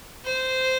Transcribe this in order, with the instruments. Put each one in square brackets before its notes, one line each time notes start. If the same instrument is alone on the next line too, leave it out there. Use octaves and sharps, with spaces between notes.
[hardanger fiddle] C5